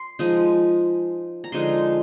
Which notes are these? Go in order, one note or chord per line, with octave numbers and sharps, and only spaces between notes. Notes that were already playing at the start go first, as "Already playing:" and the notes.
Already playing: C6
F3 G#3 D#4
A#5
D3 F3 G#3 D#4 C6